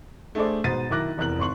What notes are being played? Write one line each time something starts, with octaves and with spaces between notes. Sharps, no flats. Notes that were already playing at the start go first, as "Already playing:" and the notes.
A3 D4 G#4 A4 C5 D5
G#2 B2 C5 A6 D#7
B1 D#3 E4 D6 F#6 A#6
F1 E2 A#4 F#6 F#7
G#1 C6 C#6 F#7